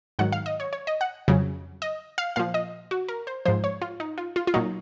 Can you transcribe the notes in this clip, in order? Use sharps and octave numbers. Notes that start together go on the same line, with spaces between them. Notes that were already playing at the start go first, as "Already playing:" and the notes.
G#2 D#3 F#3 F#5
F5
D#5
C#5
C#5
D#5
F#5
F2 C#3 F#3
D#5
F5
A#2 F3 F5
D#5
F#4
A#4
C5
G#2 F3 C5
C#5
F4
D#4
F4
F4
F4
A#2 F#3 D#4